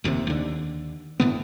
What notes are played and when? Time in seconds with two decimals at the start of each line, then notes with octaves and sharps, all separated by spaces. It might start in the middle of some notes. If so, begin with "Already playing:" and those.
0.04 F1 D#2 G#2 C3
0.27 D#2 D3
1.20 F#1 A2 D3 B3